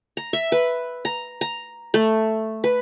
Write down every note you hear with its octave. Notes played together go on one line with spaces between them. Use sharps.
A#5
E5
B4
A#5
A#5
A3
B4